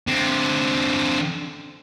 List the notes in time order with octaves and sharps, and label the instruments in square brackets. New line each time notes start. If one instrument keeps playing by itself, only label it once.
[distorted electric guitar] D3 C4